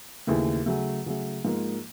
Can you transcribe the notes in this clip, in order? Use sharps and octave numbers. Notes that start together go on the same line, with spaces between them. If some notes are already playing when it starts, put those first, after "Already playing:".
D#2 C#3 E3 A3
C#3 F#3 A3
C#3 F#3 A3
G#2 F3 A#3